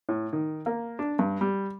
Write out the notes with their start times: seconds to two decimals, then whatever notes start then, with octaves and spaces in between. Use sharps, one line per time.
0.09 A2
0.33 D#3
0.66 A#3
0.99 D4
1.19 G2
1.41 G3